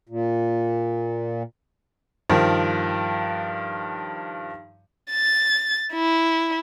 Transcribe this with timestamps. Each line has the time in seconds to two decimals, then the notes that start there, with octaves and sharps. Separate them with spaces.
0.09 A#2
2.30 G2 D#3 F3
5.12 A6
5.93 E4